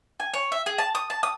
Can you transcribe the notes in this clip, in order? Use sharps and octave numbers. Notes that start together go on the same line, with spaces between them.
G#5
C#5
E5
G#4
A5
D#6
A5
D#6